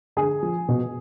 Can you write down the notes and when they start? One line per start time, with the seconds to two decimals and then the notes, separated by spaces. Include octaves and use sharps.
0.17 D3 G#4 G#5
0.43 F3
0.69 B2